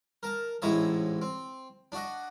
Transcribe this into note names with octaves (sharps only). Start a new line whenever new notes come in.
A#4 A5
A1 G#2 E4 C#5 D#5 A5
C4
D4 F#4 D#5